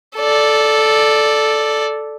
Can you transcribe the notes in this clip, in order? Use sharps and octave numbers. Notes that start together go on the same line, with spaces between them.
A4 D5